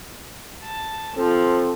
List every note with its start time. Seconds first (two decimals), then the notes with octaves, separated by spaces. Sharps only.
0.64 A5
1.18 F3 C4 A4